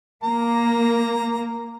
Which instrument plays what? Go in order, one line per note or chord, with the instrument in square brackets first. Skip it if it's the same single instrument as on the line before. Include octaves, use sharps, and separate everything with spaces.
[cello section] A#3 [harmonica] A#5